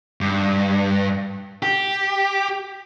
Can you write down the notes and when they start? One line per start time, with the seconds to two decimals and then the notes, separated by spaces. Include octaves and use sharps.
0.21 G2
1.63 G4